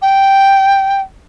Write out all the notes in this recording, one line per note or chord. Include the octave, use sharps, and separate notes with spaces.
G5